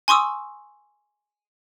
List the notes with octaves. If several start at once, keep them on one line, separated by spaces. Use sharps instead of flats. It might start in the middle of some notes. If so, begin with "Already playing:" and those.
G#5 C6 C#6 D#6 E6